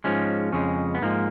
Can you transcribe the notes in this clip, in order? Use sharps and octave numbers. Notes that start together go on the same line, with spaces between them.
G#2 F3 G#3 C#4
F2 C#3 G#3 C#4
B3
G#2 F3 G#3 A#3